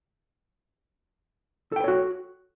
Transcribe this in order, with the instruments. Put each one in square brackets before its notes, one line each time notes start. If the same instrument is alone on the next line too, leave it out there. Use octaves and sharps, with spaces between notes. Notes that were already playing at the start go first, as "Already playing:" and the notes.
[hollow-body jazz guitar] A4
G5
B4
C#5
F#4